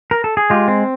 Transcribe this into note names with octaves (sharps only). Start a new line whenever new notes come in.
A#4
A4
G#4
G#3 F4 G4
C4